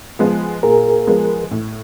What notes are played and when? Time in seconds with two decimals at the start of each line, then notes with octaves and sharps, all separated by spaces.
0.19 F3 G#3 B3
0.63 A#2 G#4 A#4
1.07 F3 G#3 B3
1.51 A2